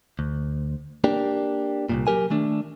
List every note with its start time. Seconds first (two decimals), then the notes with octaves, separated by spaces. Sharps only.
0.19 D2
1.04 A#3 D4 G4
1.89 C2 F#2 A#2
2.07 F#3 G4 A#4 G#5
2.30 D#3 A3 D4